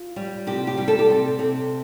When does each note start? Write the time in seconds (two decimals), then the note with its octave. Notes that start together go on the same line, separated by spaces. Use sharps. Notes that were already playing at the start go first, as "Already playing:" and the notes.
Already playing: F4
0.16 G3
0.47 C3 G4
0.67 G4
0.77 G3
0.88 A4
0.99 G4
1.08 C3 A4
1.39 C3